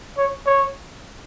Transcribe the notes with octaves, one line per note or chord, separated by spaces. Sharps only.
C#5
C#5